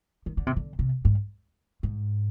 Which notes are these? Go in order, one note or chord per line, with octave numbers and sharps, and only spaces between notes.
D#3
D3
C3
D3
C3
G#2
G#2